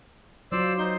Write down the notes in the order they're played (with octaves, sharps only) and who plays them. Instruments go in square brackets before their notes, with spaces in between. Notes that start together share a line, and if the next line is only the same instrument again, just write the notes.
[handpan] F#3 F4 [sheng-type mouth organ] C5 D5 E6
[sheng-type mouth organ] D#4 C5 C6